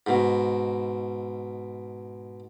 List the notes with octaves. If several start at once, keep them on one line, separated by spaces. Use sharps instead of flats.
G#2 B2